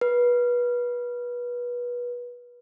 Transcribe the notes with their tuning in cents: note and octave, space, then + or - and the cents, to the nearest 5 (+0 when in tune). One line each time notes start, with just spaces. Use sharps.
B4 -25